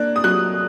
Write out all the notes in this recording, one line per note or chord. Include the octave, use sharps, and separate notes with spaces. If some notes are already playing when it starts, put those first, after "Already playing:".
Already playing: A#3 D4 F#6
D#6
F#3 F#6